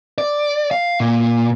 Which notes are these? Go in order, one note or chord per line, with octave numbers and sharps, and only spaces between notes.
D5
F5
A#2